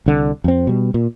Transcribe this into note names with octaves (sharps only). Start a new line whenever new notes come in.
C2 D3
F2 C4
B2 G3
A#2